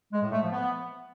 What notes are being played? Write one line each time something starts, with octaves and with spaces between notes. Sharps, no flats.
G#3
A2
A3
F3
B3